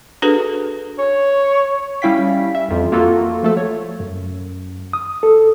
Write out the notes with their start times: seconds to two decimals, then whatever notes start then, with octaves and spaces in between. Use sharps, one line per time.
0.22 D4 F#4 G#4 A4 B4
0.99 C#5
2.02 G3 C#4 E4 F5 G5 B6
2.55 E5
2.68 A1 F2
2.92 A#3 F4 F#4 A4
3.43 F3 A3 A4
3.57 C#5
4.00 F#2
4.93 D#6
5.23 A4